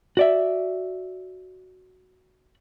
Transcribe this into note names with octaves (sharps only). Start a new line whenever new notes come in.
F#4 D5 E5